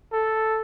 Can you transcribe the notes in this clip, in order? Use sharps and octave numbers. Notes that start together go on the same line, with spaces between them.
A4